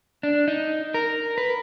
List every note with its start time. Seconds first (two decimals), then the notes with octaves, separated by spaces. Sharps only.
0.23 D4
0.48 D#4
0.94 A#4
1.38 B4